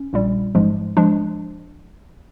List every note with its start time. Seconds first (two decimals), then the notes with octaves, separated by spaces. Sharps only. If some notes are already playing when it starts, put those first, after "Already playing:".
Already playing: C#4
0.13 A#1 A#2 G3
0.55 A1 G#2 F3 G#3
0.97 F3 G#3 D4